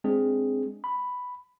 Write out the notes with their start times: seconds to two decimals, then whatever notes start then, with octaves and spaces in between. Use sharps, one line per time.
0.04 G#3 C4 D4 G#4
0.84 B5